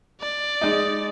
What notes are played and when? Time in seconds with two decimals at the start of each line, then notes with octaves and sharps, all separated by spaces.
0.21 D5
0.61 G#3 D#4